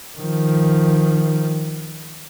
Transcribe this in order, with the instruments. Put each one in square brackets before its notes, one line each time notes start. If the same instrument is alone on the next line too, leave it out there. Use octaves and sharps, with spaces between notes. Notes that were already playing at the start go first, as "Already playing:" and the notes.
[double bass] D#3 F3